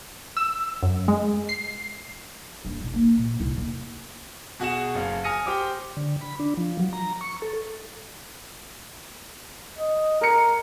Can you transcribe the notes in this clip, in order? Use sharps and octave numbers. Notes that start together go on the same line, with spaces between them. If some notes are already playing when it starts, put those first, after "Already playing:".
E6
F#2
G#3
C7
D#1 D4
E1 A1
A#3 D#4
A#2
C2 E4
D#2
B2 F#4 G#4 F#5 E7
F#1 C#3 F5
G#5 D#6 F6 A#6 C#7 D#7
G4 C5 G5 D6 F6
D3
B5
D4
F3
F#3
A#5
C#6
A4
D#5
A#4 A#5 C#7